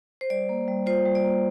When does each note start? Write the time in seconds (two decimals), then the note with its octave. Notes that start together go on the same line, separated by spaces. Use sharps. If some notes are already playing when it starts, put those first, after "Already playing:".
0.21 C5
0.30 G3 D5
0.49 A#3
0.68 G3
0.86 F4 C5
1.05 G3
1.15 D5
1.24 A#3